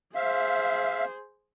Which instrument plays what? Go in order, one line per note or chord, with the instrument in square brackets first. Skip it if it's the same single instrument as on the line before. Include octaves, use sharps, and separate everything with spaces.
[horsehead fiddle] G#4 C5 [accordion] E5 F5